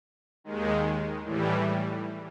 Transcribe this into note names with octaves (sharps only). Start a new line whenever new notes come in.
D#2 D#3 G#3
A2 E3 G3